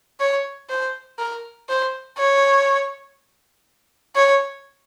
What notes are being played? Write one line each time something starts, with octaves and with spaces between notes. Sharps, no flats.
C#5
C5
A#4
C5
C#5
C#5